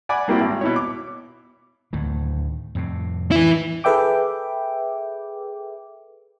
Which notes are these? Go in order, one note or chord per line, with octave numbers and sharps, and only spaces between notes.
D5 F#5 G#5 B5 D6
G3 A#3 C4 E4 F#4
G#1
B2 E4 C#5
D6
D2 A2 D#3
F2 A2 C3
E3 E4
G#4 A4 B4 E5 G5 D6